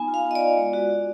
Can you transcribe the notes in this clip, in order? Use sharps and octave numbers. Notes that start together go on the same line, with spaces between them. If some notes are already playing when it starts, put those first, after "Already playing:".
Already playing: B3 D#4 G#5
F4
F5
F4
D#5
D5
F4
G#3
F#4
F#4